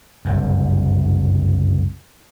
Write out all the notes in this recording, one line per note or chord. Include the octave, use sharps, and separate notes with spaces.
F#1 C2 G2